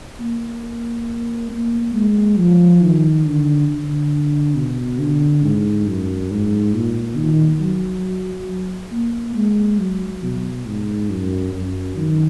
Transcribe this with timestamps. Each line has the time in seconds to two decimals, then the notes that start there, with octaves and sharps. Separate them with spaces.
0.20 A#3
1.51 A#3
1.95 G#3
2.38 F3
2.82 D#3
3.26 D3
3.69 D3
4.56 B2
4.99 D3
5.43 G#2
5.87 F#2
6.31 G#2
6.74 A#2
7.18 D#3
7.61 F#3
8.92 A#3
9.36 G#3
9.79 F#3
10.23 B2
10.66 G#2
11.09 F#2
11.53 F#2
11.97 D#3